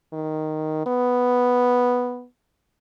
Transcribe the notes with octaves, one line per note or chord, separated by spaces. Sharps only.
D#3
B3